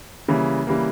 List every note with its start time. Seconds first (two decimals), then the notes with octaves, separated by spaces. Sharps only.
0.28 C#3 E3 G3 A#3
0.67 C#3 E3 G3 A#3